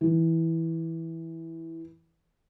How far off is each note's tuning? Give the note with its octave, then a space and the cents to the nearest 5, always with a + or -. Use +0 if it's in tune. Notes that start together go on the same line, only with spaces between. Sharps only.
E3 -10